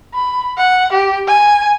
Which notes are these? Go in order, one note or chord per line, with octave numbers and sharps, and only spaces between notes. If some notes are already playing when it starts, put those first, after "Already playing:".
B5
F#5
G4
G#5